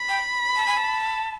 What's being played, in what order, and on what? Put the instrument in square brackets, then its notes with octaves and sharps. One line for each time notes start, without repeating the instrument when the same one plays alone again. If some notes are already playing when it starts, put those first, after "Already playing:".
Already playing: [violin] B5
[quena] G5
A5
G#5
A5